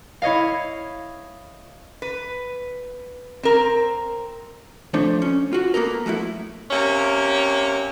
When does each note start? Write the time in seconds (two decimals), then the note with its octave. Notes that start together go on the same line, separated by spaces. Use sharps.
0.22 E4 C#5 D#5 F5
2.02 B4
3.43 C4 A#4
4.94 F3 A3 D4 C5 C#5
5.22 C#4
5.53 F4 F#4
5.74 A#3 B3 A4 A#4
6.06 F3 F#3 A3 E4
6.70 C3 A#3 C#4